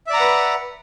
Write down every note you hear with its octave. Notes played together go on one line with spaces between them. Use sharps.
B4 D5 E5 F#5 A#5